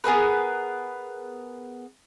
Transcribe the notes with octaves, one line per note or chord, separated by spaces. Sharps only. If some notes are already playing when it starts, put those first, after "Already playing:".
B3 G#4 A#4 B4